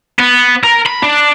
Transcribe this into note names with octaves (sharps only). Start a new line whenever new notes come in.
B3
A#4
B5
D4